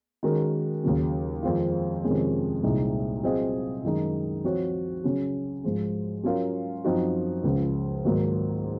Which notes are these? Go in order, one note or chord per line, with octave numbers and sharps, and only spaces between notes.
D#3 G#3 C#4 F#4 A#4
D#2 C#3 F#3
F2 D#3 G#3 C4 F4
F2 C3 D#3 G#3 C#4
C2 A#2 G#3 D#4
F#3 C4 F4 G#4 D#5
F#2 D#3 G#3 D#4
F3 C4 F#4 C#5
C#3 F#3 C#4
G#2 F3 G#3
F#3 C#4 F4 A#4
F#2 F3 C4 D#4 F#4
C#2 C#3 F3
G#2 D#3 F#3 A#3